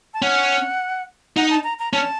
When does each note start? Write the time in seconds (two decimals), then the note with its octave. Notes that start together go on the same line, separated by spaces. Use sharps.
0.14 A5
0.22 C#4 F#5
1.37 D#4 F#5
1.50 A5
1.64 A#5
1.79 A#5
1.93 C#4 A5